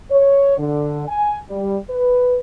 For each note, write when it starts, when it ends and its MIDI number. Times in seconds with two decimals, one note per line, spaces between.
0.10 0.57 73
0.58 1.07 50
1.07 1.38 80
1.49 1.77 55
1.89 2.38 71